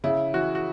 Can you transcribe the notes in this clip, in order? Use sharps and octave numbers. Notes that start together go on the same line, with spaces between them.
C#3 E4
E3 F#4
F#4